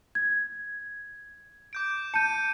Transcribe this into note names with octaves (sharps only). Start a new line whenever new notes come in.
G#6
D6 G6 D7
A5 G6 C#7 D#7